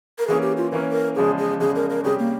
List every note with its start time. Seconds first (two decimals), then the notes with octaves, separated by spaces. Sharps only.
0.19 A#4
0.27 E3 A#3 C#4 G#4
0.42 G4
0.57 F4
0.72 E3 A#3 C#4 A#4
0.92 A#4
1.16 E2 C#3 F3 G#3 G#4
1.38 G#4
1.60 E2 C#3 F3 G#3 G#4
1.75 A#4
1.90 A#4
2.04 C3 G3 C#4 G4 G#4
2.19 A#3